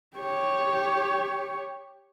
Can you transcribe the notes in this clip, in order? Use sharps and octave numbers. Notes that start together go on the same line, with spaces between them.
G4 C#5